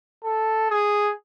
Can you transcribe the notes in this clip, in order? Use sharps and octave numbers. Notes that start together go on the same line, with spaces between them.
A4
G#4